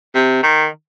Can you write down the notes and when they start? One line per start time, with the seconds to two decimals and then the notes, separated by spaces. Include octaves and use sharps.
0.15 C3
0.43 D#3